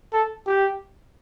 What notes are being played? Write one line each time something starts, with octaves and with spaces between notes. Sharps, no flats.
A4
G4